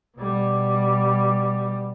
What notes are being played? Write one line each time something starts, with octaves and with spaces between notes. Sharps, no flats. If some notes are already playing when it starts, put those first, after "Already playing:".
B2 G3